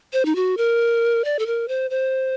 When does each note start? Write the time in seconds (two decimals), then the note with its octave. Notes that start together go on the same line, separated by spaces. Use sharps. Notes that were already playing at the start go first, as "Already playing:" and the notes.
0.13 C5
0.25 D#4
0.36 F#4
0.57 A#4
1.25 D5
1.39 A4
1.46 A#4
1.68 C5
1.90 C5